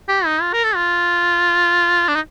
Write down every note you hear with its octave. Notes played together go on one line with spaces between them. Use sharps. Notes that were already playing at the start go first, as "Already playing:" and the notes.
G4
D#4
F4
A#4
A4
F4
D4
D#4